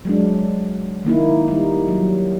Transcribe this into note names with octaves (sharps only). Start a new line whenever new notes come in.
F#3 G#3 D4
D#3 A#3 D#4 E4
G3 D#4
F#3 G3